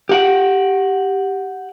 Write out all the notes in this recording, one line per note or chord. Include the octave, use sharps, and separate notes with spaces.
G4 F#5 G5